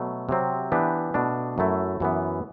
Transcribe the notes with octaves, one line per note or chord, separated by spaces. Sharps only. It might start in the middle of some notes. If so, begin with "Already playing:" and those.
Already playing: B2 F#3 A3
C3 F#3 C4
E3 B3 D4 G4 B4
B2 A3 D4
F#2 F#3 A3 E4
F#2 E3 B3